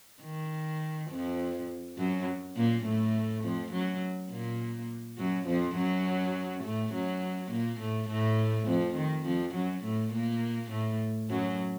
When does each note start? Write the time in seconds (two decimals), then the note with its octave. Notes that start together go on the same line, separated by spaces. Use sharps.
0.22 D#3
1.10 F2 F3
1.98 F#2 F#3
2.56 A#2 A#3
2.85 A2 A3
3.44 F2 F3
3.72 F#2 F#3
4.30 A#2 A#3
5.18 F#2 F#3
5.47 F2 F3
5.76 F#2 F#3
6.64 A2 A3
6.93 F#2 F#3
7.51 A#2 A#3
7.80 A2 A3
8.09 A2 A3
8.67 F2 F3
8.97 D#3
9.26 F2 F3
9.54 F#2 F#3
9.84 A2 A3
10.13 A#2 A#3
10.71 A2 A3
11.29 F#2 F#3